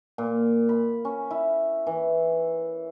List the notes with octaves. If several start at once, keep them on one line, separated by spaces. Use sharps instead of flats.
A#2
B5
C#4
E4
E3